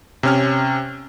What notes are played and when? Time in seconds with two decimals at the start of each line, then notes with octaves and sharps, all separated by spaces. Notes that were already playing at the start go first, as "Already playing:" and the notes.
0.23 C3 C#4 F6